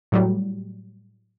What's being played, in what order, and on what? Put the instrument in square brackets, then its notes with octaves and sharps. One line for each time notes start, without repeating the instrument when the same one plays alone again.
[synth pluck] A2 F#3 G3